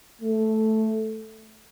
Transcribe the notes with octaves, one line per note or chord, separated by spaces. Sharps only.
A3